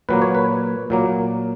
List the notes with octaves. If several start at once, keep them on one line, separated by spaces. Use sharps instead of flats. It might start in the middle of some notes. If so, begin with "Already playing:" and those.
A#2 F#3 A#3 B4
C#5
B4
A#2 F#3 A#3